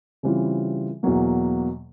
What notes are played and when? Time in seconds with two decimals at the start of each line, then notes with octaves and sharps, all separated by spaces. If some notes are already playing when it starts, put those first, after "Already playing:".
0.23 C#3 E3 G3 C4 F4
1.03 E2 B2 F#3 A#3